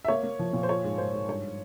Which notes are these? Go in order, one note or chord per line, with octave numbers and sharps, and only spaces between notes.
E5
A#3 C#5
A#3
F3
A#2
C5
F4 C#5
G#2
G#2 C5
G#2
G2 C#5